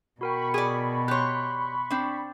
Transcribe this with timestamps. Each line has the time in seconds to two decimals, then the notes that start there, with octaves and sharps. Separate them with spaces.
0.21 B2 F#4 A#4 G5 B5 C#6
0.54 G#4 D5
1.08 G4 C#5 C6 F#6
1.91 C4 D4